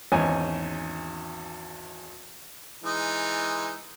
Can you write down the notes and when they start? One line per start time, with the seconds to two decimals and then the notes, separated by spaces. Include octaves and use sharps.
0.12 G#1 E2 C#4 D#4 G#5
2.84 E3 G#3 D#4